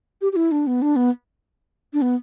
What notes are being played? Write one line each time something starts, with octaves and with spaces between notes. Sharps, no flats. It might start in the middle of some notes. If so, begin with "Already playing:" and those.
G4
G4
E4
D4
B3
D4
B3
D4
B3